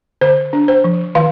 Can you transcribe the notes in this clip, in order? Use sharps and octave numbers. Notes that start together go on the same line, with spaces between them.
D3 C5
D4
C5
F3
D#3 F5